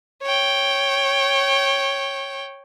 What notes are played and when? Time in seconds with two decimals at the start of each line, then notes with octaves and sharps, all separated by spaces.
0.23 C#5 G5